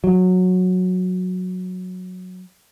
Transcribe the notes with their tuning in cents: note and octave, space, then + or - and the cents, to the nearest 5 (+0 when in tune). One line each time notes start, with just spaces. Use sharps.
F#3 -15